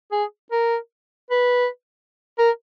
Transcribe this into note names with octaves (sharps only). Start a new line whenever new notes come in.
G#4
A#4
B4
A#4